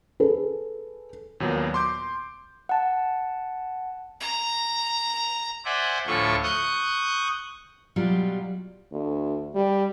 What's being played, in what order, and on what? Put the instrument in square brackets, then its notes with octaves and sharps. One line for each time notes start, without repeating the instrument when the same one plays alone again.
[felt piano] G#4 A4 B4
[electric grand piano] D#2 A#2 F#3 B3
C6 D6 G6
[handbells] F#5 A5
[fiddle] A#5
[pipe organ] C5 D5 E5 F#5 G#5
D2 A2 F3 F4 A4 C#6
C#6 D#6 F#6 G6
[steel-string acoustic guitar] B2 F#3 G3 F4
[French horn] D2
G3